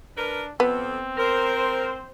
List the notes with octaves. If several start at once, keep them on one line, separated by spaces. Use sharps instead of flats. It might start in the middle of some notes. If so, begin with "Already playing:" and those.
D4 A#4 B4
F2 B3 C4 A4
A#4 C5